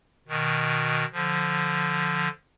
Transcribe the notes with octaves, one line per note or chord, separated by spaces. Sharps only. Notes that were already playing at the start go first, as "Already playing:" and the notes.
B2 D#3
D3 F3